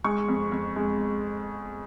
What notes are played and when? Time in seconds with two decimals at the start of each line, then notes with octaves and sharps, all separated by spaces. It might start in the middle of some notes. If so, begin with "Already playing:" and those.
0.04 G#3 C#6
0.28 F2
0.52 F2
0.76 G#3